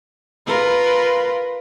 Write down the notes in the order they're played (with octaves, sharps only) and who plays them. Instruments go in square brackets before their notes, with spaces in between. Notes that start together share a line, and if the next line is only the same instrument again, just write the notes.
[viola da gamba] F4 A#4 B4